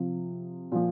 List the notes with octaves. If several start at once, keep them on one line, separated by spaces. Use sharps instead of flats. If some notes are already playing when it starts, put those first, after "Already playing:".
Already playing: C3 F3
A#2 F3